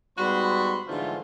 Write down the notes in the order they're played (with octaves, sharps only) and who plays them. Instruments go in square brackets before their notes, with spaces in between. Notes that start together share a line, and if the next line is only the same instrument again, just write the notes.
[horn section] G#2 G3 B3 F#4 B5 C6
G#2 D3 E3 F3 A3 F4